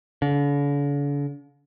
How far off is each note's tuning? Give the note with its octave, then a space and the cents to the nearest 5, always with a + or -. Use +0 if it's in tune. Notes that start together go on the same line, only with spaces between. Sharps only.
D3 -45